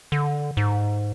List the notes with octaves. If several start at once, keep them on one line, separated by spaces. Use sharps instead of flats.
D3
G#2